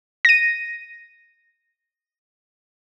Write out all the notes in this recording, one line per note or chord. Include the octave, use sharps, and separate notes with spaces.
A#6 D#7